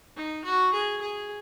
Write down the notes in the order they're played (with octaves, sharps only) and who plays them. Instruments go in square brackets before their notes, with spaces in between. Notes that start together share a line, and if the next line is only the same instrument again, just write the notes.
[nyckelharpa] D#4
F#4
G#4
G#4